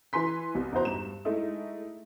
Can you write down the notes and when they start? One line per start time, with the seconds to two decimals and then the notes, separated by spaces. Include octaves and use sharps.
0.13 E3 B4 G#5 C6 B6
0.55 C2
0.72 E2 D#4 F#4 C5 A#5
0.85 G2 E7
1.25 G#3 A3 D#4 E4